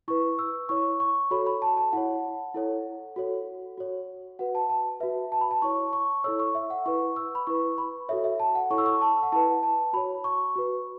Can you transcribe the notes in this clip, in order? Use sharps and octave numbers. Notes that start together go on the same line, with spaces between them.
E4 B4 C#6
E6
E4 C#5 C#6
C#6
F#4 A4 C#5 B5
B5
A5
A5
E4 C#5 F#5
E4 A4 C#5
F#4 A4 C#5
F#4 C#5
F#4 B4 F#5
A5
A5
F#4 B4 E5
A5
B5
A5
E4 C#5 C#6
C#6
E4 A4 C#5 E6
C#6
E5
F#5
E4 B4 C#6
E6
B5
E4 B4 C#6
B5
F#4 A4 C#5 E5
E5
A5
F#5
E4 A4 C#5 C#6
E6
C#6
A5
F#5
E4 B4 A5
A5
F#4 C#5 B5
C#6
F#4 B4